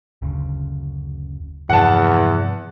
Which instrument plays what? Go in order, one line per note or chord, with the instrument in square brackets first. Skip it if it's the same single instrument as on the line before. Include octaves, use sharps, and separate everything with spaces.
[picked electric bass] F#1 D2 C#3
[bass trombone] E2 [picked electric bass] G2 C3 F3 [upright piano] F#5 A5